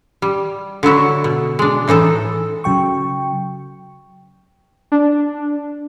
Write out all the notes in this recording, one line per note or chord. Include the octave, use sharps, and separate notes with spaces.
G3
D3 F#3 E4 F#4
B2
G#3 D4
A2 E3 D#4 A4
C#3 F#3 G5 C#6
D4